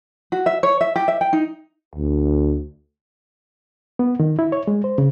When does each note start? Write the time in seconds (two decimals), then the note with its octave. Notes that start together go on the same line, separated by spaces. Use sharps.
0.32 F#4
0.46 E5
0.63 C#5
0.81 E5
0.96 G4
1.08 E5
1.21 G5
1.33 D#4
1.95 D2
3.99 B3
4.20 D#3
4.39 E4
4.52 C#5
4.67 G#3
4.84 C5
4.98 C#3